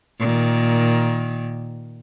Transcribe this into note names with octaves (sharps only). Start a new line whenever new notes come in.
A#2 D#3